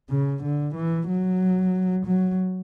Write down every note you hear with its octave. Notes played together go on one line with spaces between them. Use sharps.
C#3
D3
E3
F#3
F#3